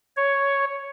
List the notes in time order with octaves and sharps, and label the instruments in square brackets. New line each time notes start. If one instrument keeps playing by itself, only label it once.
[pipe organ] C#5